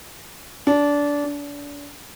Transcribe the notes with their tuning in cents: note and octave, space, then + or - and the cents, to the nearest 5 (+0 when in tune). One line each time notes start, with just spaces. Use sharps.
D4 -20
D4 -35